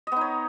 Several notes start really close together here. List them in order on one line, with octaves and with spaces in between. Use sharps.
D#5 B3 D#4 C#5